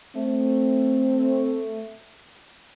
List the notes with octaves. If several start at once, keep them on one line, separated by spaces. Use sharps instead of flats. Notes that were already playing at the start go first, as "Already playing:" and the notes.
A3 C4